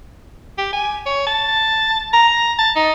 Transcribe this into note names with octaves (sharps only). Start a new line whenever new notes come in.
G4
G#5
C#5
A5
A#5
A5
D#4